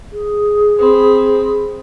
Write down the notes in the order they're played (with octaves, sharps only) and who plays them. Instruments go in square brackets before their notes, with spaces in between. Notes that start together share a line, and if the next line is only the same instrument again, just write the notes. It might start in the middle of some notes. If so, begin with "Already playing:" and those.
[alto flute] G#4
[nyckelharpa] C4 B5